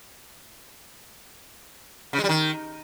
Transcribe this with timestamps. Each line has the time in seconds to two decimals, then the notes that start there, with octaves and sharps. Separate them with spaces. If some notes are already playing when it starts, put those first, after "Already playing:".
2.13 C#3
2.18 G#3
2.24 G3
2.29 D#3